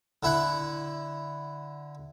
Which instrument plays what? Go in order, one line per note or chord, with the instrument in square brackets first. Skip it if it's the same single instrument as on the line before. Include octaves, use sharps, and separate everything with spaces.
[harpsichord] D3 E4 F#5